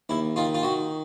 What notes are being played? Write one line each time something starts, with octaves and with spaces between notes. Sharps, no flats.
D#2 E4
D#3 F4
F4
D#3 F#4